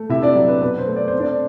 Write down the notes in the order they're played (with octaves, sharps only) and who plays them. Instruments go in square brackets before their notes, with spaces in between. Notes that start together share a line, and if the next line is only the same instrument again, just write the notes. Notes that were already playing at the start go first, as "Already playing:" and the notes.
Already playing: [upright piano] A3
C3 E4 E5
D4 D5
F#3
B4
B2 B4
C5
A3
D5
C5
C4
D4 D5